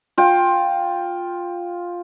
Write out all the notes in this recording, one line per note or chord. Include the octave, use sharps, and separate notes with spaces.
F4 G5